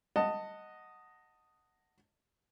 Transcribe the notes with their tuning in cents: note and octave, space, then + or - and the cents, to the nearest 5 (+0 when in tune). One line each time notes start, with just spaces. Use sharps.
D#5 +0 F#5 +0 A5 +25